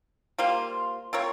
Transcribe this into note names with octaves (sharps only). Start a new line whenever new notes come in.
G3 A#3 F4 C5
C4 F4 A#4 C#5